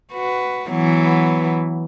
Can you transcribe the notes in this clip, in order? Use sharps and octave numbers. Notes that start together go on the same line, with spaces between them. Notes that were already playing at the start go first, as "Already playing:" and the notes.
F#4 B4
E3 F#3 B3